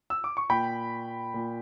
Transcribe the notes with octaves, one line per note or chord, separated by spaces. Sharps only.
E6
D6
C#6
A#2 G5 B5
A#2